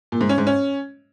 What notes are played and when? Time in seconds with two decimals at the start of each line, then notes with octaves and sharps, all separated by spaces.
0.12 A#2
0.21 G#2
0.29 C#4
0.38 G#2
0.47 C#4